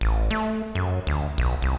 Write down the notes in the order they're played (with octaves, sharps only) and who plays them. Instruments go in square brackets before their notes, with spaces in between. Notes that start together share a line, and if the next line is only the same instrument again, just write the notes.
[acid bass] A1
A3
F#2
D2
B1
C2